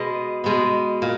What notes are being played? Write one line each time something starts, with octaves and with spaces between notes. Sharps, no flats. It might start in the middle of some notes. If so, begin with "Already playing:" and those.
Already playing: B2 G#3 B3 D#5
B2 G#3 B3
A#2